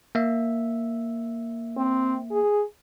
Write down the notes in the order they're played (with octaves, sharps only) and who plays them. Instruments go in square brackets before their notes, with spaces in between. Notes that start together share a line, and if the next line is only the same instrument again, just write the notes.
[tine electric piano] A#3 E5
[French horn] C4
G#4